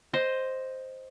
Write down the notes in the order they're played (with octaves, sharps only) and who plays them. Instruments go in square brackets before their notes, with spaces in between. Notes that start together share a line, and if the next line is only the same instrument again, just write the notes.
[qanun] C5 D#5